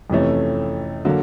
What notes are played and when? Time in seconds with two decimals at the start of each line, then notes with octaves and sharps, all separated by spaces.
0.10 F2 C3 E3 A3 C#4
1.05 D3 F#3 A#3